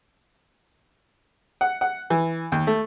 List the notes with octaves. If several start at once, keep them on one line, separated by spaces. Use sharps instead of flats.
F#5
F#5
E3
D#2
A3